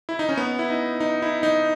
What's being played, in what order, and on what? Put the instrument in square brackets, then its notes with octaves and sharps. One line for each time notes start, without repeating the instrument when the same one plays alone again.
[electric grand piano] E4
D#4
C#4
B3
E4
D#4
D#4
E4
D#4